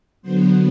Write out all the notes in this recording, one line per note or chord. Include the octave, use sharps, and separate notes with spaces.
D3 F#3 B3 C5